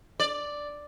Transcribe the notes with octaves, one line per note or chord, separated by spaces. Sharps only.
D5